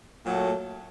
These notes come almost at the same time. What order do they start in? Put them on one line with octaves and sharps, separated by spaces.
A#2 F#3 A3